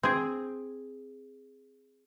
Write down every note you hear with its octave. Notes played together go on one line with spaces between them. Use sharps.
C4 G#4